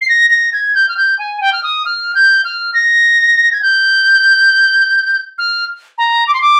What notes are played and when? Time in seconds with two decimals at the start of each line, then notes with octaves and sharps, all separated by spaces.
0.01 C7
0.09 A#6
0.30 A#6
0.53 G#6
0.75 G6
0.89 F6
0.97 G6
1.19 G#5
1.41 G5
1.53 F6
1.63 D#6
1.86 F6
2.15 G6
2.45 F6
2.74 A#6
3.52 G#6
3.62 G6
5.38 F6
5.98 A#5
6.27 D6
6.34 C6
6.42 D6